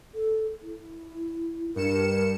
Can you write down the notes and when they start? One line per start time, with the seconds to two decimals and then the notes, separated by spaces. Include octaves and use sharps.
0.14 A4
0.62 E4
1.76 G2 A#4 C#7 E7